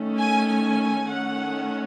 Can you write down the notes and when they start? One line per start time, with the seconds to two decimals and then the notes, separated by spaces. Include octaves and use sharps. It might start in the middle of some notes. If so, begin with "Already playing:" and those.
Already playing: D#3 A3 C#4
0.17 G#5
0.47 G#5
1.07 D#3 A3 C#4 F#5